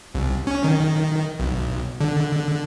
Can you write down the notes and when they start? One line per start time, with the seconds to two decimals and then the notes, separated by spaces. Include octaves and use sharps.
0.15 C2
0.47 C#4
0.64 D#3
1.40 B1
2.00 D3